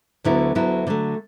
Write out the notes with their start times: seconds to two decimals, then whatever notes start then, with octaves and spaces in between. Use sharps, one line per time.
0.24 D2 D3 F#3 B3 E4
0.55 D2 D3 F#3 B3 E4
0.87 D3 F#3 A3